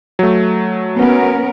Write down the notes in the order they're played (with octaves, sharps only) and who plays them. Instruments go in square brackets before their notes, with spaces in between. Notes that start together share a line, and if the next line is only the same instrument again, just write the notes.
[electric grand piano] F#3 A3
[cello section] B3 C#4 A#4